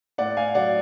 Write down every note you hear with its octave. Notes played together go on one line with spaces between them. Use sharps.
A2 D5 F#5
A2 F5 G#5
F#3 D5 F#5